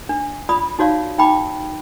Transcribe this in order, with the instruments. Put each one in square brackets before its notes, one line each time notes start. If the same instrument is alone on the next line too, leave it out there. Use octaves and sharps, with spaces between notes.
[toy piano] D4
F4 D5 B5 D#6
D#4 F#4 C#5 D5 F5
D#4 G5 B5 D6